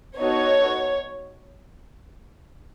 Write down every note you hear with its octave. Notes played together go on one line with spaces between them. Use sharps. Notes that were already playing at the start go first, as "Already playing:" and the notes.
B3 D#4 F#4 A4 C#5